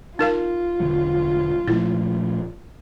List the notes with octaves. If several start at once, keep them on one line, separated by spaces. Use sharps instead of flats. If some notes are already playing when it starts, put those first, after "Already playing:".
D#4 F4 A#4 F5
E1 D3 F#3
A#2 F3 A3 E4